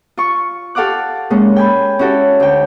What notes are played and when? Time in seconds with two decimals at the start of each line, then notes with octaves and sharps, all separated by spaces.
0.17 F4 C#6
0.75 G4 A4 F5 F#5 D6 F#6
1.30 A#2 G#3 C#4
1.56 G5 G#5 B5
1.99 C#4 E4 F#4 G4 A4
2.40 D2 G5